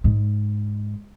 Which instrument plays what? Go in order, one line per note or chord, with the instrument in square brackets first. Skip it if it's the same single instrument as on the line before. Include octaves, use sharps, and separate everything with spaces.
[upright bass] G#2 G#3